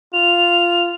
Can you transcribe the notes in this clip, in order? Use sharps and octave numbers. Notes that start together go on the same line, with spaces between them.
F4 F7